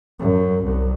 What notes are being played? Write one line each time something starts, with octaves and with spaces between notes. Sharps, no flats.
F#2
C2